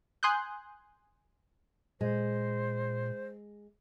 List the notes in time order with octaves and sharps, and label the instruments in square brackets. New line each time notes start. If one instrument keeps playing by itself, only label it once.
[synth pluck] G#5 C6 D#6 F#6 G6
[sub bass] A#2 [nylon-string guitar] G#3 [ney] C5